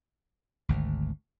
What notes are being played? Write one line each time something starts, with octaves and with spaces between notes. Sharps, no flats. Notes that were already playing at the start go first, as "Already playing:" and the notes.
G#1 D2